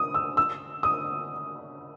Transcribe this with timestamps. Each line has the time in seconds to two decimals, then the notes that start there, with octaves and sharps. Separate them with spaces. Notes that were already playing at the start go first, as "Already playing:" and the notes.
Already playing: D#6
0.14 E6
0.37 E6
0.83 D#6